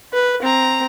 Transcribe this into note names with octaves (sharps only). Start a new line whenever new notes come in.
B4
C4 A#5